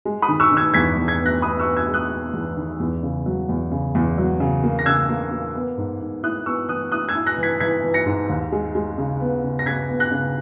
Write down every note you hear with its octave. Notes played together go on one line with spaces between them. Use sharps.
G#3
B5 D#6
D#3
C#6 E6
D#3
E6 G#6
E2 G#6 B6
E2
G#6 B6
B3
F#6 A#6
B3 B5 D#6
C#6 E6
B3
E6 G#6
G#3
D#6 F#6
B3
E2
D#3
E2
C#3
F#3
E2
C#3
E2
F#3
C#3
A#3
A#6
C#3 E6 G#6
A#3
A#3
B3
G#2
G#2
E4 D#6 F#6
B3 C#6 E6
E3 D#6 F#6
E4 D#6 F#6
E6 G#6
E4
F#6 A#6
E3
G#6 B6
E3 G#6 B6
E3
A#6 C#7
G#2
D#2
G#3
G#3
C#3
B3
C#3
A#6
C#3 G#6 B6
B3
F#6 A#6
C#3